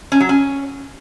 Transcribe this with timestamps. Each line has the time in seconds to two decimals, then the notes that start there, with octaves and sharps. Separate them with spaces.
0.12 C#4
0.20 F#3
0.29 C#4